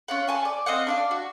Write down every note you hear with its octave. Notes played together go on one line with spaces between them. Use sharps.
C#4 F4 F#5
E5 G#5 A5
D5
C4 D#5 F5 F#5
D4 D5 F5
F#4